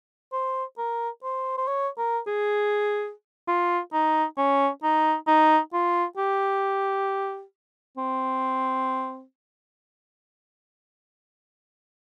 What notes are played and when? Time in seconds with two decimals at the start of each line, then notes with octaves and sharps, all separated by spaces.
0.33 C5
0.78 A#4
1.23 C5
1.58 C5
1.67 C#5
1.98 A#4
2.27 G#4
3.48 F4
3.93 D#4
4.38 C#4
4.83 D#4
5.27 D#4
5.73 F4
6.17 G4
7.97 C4